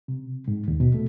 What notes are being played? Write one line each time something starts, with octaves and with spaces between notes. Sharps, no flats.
C3
G#2
D#2
B2
A3